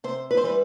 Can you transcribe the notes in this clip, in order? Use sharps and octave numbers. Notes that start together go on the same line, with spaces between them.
C3 C5
B4
C5
E3 G3 B4